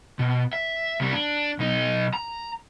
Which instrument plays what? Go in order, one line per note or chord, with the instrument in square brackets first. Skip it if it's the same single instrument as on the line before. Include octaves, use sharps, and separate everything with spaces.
[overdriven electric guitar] B2
E5
C2 G3
D4
B1 D#4
A#5